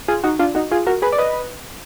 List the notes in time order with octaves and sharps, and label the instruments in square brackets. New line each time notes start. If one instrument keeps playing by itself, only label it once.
[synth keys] F4 G#4
D#4 F#4
D4 F4
D#4 F#4
F4 G#4
F#4 A#4
G#4 B4
D5
B4 D#5